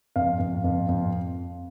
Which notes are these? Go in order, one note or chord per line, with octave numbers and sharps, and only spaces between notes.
F2 F5
F2
F2
F2